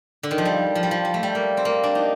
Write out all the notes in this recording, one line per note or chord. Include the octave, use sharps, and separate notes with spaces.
D3
D#3
F3
G3
F3
G3
F3
G3
A3
G3
A#3
C4
A#3
D4
D#4